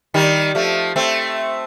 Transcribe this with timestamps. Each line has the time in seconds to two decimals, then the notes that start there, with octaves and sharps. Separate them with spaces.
0.14 D#3 G3
0.55 F3 A3
0.96 A3 C4